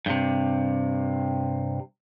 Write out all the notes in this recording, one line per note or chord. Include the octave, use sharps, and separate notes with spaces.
G2 C3